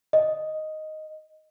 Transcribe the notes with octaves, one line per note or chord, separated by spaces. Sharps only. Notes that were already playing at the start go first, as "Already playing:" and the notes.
D#5